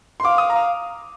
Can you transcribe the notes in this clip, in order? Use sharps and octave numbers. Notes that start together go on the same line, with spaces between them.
C6
F5 D6
D#6
A#5